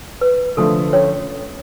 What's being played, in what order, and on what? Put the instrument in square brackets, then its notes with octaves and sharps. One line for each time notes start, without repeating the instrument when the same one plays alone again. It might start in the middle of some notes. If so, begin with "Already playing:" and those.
[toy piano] B4
[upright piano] D3 F3 A3 [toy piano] A4
[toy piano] C#4 C#5